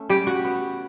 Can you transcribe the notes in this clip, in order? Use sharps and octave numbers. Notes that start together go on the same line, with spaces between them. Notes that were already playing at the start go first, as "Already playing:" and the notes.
Already playing: A3 C#4
C#3 G3 G4
F#4
B3